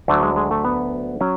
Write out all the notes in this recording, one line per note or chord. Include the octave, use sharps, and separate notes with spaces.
D2 D3 F#3 A3
G#3
G#3
A3
B3
F#3 C#4